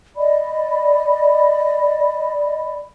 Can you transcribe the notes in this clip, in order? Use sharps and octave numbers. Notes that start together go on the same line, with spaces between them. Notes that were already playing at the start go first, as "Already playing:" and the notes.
D5 D#5 B5